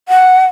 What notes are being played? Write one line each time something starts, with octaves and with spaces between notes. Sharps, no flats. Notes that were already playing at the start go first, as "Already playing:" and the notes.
F#5